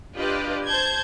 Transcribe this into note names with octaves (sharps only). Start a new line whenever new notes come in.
D4 F4 G4 B4 D5 D#5
C5 A5 G6 G#6